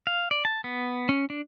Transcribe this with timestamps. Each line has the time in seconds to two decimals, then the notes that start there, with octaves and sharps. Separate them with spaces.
0.07 F5
0.31 D5
0.45 A5
0.64 B3
1.09 C#4
1.30 D4